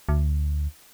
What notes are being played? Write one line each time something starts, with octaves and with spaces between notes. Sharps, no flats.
D2